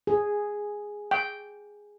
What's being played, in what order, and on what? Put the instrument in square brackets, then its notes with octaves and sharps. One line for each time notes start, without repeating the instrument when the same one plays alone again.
[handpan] G#4
[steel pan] G5